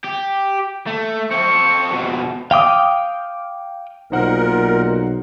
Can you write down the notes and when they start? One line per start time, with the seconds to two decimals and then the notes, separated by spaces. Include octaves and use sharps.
0.04 G4
0.87 A3
1.31 C4 A4 C#6
1.91 F2 B2
2.51 F5 G5 D6 D#6
4.12 B1 A#2 D#4 A#4 C5 F#5